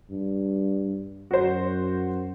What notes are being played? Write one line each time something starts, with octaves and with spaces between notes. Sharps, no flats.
G2
F#2 F#4 C5